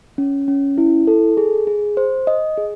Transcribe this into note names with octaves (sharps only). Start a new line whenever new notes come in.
C#4
C#4
E4
A4
G#4
G#4
C5
D#5
G#4